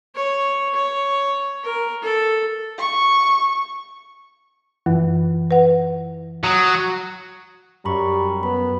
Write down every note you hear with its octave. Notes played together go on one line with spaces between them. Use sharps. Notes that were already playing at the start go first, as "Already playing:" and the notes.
C#5
C#5
A#4
A4
C#6
F#2 E3
B4 F#5
F#3 D#6
F#2 G3 A#5 B5 C#6
B3 B5